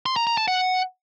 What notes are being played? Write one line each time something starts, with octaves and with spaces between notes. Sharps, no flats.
C6
A#5
A#5
A5
F#5